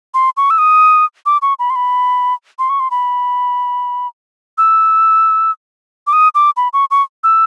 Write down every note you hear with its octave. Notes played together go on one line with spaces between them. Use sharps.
C6
C#6
E6
D#6
D6
C#6
B5
C6
B5
C6
C#6
C6
B5
E6
D6
D#6
D6
B5
C#6
C#6
E6